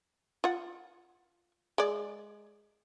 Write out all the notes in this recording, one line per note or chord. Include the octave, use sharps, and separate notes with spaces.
F4 F#5
G#3 D5